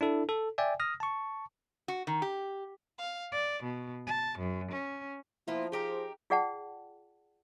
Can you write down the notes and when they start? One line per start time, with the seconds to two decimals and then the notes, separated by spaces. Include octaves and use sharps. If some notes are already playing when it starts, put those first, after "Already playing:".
0.01 D4 E4 A4
0.29 A4
0.58 D5 E5 G5 G#5
0.80 D#6 F6 A#6
1.00 A5 C#6
1.88 F#4
2.07 D#3
2.22 G4
2.97 F5
3.31 D5
3.62 B2
4.06 A5
4.37 F#2
4.70 C#4
5.48 F3 A#3 B3 E4 F4
5.72 D#4 G4 G#4 A#4
6.30 F4 G#4 D5 F#5 G5 A5